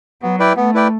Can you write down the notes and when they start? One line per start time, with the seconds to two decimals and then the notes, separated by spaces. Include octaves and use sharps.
0.22 F#3 B3
0.39 E4 B4 D5 G5
0.57 A3 B3
0.74 E4 B4 D5 G5